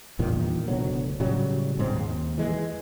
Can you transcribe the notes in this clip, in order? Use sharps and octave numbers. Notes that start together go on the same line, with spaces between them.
E2 G2 A#2 D#3
F#1 D2 B2 F#3
A2 C#3 F#3 G3
D#1 G#2 C4
D#2
E3 G#3